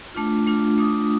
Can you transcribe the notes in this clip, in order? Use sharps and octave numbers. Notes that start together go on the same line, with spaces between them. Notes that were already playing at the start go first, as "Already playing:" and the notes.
A3 D4 F4
A3 D4 F4
A3 D4 F4 D#6